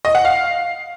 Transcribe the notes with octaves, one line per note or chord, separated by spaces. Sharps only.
D#5
F#5
F5